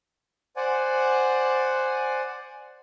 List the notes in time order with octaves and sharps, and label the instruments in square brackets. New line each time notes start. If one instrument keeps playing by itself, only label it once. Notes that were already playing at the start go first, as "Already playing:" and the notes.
[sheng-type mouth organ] C5 D5 F#5 G#5